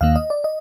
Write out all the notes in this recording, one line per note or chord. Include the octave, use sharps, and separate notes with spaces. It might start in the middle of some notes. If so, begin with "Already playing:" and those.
D#2 D#3 A#3 F5
D#5
D5
D#5